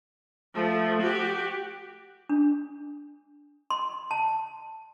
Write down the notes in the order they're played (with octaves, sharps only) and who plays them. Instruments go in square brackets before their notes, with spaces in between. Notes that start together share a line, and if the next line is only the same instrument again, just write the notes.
[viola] F3 A3
F#4 G4
[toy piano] D4
C6
A5